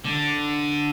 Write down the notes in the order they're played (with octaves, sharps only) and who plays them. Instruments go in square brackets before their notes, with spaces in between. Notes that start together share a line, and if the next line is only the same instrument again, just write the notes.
[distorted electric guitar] D3